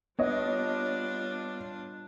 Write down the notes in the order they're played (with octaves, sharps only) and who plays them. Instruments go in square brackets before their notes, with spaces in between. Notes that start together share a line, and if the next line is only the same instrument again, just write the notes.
[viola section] G3 D4 F4 [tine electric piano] B3 [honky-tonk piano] C#5 D#5